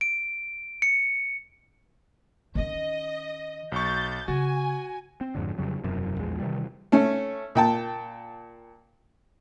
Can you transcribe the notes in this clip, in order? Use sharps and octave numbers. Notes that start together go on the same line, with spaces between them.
D7
C#7
D#3 C#4 D#5
B1 C#6 G6 A6
C#3 F#4 G#5
C4
F2 G#2 D3
F2 C#3 F#3 G3
E1 F#2 C3
A#1 E2 G#3
C3 D#3 E3 G3
A3 C#4
A#2 G5 A5